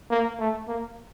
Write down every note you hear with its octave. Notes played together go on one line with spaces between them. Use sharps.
A#3
A3
A#3